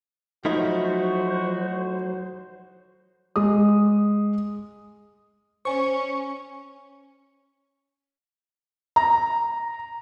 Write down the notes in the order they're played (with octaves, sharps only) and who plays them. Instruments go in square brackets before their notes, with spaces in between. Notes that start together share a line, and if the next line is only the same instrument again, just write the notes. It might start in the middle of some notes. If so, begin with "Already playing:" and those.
[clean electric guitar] F3 A3 E4 [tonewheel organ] F#3 C5 [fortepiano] D#4 [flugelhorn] F#4
[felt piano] G#3 D#6
[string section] C#4 [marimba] C5 G#5 [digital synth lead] C#6
[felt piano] A#5